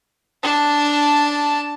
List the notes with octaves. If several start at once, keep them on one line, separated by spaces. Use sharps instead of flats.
D4 A5